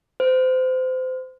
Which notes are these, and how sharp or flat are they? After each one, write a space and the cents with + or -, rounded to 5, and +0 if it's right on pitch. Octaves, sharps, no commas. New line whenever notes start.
C5 -30